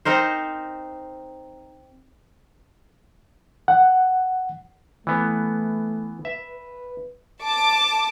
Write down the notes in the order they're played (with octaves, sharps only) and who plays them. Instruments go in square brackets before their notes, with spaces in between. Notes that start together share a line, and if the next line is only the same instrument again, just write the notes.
[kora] C4 D#4 A#4 C5
[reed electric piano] F#5
[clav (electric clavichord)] E3 B3 [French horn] A3
[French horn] B4 [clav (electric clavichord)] E5
[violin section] A5 D6